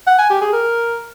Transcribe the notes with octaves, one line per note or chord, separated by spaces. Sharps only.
F#5
G#5
G4
G#4
A#4